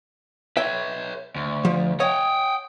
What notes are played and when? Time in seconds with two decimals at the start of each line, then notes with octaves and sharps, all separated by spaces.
0.57 B4 C#5 E5 G5
1.36 D2
1.65 F3
2.00 C#5 D#5 F#5 G5 D#6